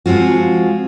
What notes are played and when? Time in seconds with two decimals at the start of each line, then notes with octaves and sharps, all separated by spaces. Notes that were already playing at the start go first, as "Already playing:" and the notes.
0.06 F3 G#3 C4 F4 F#4